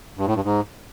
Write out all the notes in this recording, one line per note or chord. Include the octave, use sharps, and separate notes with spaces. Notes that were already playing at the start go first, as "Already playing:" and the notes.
G2
A2
G2
G#2